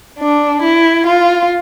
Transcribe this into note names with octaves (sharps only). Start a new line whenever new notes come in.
D4
E4
F4